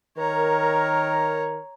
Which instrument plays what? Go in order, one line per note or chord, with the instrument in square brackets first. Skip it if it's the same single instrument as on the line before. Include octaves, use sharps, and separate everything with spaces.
[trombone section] D#3 A#4 [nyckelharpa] C#5 A#5